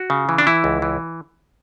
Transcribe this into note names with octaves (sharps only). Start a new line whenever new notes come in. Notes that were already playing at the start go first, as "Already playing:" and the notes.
Already playing: F#4
C#3
E3
D4
E3 E4
C#2
E3